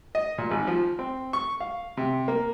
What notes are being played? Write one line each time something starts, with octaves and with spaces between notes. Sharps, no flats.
D#5
A#2
G#1
F3
C4
C#6
F5
C3
A#3